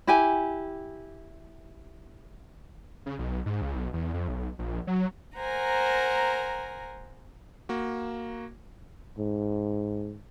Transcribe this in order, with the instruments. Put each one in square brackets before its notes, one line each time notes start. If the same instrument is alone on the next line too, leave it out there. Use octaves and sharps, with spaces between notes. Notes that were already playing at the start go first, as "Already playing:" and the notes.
[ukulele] E4 G4 G#5
[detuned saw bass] C#3
B1
G#2
C#2
B1
E2
F2
B1
A#1
F#3
[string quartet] A#4 C5 F#5 G#5 A#5
[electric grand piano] A#3 F#4
[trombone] G#2